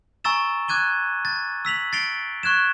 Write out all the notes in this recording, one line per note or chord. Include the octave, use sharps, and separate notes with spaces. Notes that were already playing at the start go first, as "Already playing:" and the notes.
G#5 A#5 C#6 E6 A6 E7
D6 F#6 G#6 D#7 G7
A6
E6 B6 F7 F#7
A6 C7 D7 F7 G7
C#6 F#6 G#6 E7